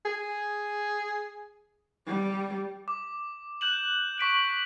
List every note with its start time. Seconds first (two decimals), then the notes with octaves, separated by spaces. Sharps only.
0.05 G#4
2.07 G3
2.88 D6
3.61 F#6 G6 E7 F#7
4.18 C#6 B6 D7 E7
4.34 F#7